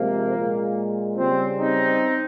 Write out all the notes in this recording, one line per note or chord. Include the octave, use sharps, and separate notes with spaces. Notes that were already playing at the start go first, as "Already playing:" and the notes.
Already playing: C3 F3 G#3 A#3
A#2 G#3
C#3 G3 C4
C4 D#4